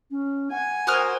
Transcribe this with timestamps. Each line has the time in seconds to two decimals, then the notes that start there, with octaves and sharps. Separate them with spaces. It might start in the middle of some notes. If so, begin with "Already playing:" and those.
0.10 C#4
0.51 F#5 G#5
0.87 F#4 A#4 C5 D#6 F6